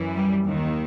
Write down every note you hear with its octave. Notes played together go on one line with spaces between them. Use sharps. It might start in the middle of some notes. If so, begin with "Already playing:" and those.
Already playing: F#2 E3
G3
D#2 D#3